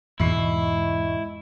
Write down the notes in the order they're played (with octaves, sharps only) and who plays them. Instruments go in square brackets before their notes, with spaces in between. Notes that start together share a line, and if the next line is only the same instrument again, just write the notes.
[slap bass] E2 G#2 B2 [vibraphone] G#3 D#5 C#6 [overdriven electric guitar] E4